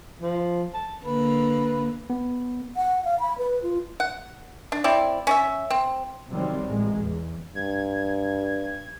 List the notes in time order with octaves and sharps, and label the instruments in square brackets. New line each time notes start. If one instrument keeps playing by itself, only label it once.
[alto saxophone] F3
A5
[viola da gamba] D3 A#3 [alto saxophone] B4
[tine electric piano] B3
[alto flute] F#5
F5
B5
B4
F4
[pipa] F#5
D4
C4 E4 D5
C#4 D5 E5
C4
[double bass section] C3 D#3 F#3 G3 C4
A1 G#3
E2
[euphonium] G2 [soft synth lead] G#6